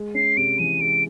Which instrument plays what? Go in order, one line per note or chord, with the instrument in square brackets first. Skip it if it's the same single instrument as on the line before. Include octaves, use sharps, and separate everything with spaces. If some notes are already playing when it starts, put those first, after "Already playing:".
Already playing: [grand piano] G#3
[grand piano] C#4 [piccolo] C7
[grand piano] C3 [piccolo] D7
[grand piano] E3 [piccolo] D#7
[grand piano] G#3 [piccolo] D7